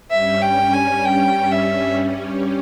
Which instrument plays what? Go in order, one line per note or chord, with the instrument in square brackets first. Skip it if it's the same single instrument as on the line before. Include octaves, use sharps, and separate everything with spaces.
[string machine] G2 G3 C#4 [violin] E5
[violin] G5
G#5
G5
E5